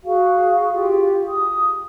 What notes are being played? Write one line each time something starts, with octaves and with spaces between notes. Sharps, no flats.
F#4 G#4 F5
F4 G4
D#6